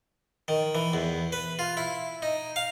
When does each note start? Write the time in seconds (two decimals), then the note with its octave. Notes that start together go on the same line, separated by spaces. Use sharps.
0.48 D#3
0.75 E3
0.93 E2
1.33 B4
1.59 F4
1.77 E4
2.22 D#4
2.56 F5